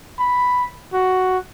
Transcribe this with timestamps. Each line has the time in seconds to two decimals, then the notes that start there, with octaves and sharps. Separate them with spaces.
0.19 B5
0.94 F#4